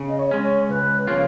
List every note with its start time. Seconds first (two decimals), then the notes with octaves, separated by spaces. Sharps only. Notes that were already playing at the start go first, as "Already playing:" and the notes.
Already playing: C#3
0.08 D#5
0.19 C#5
0.31 G#3 C#4
0.43 C#5
0.69 C#2 B4
1.07 C#3 F3 A#3 F4 C#5